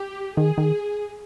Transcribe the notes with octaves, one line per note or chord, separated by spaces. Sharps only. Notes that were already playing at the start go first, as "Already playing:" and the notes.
Already playing: G4
D#3 G#4
D#3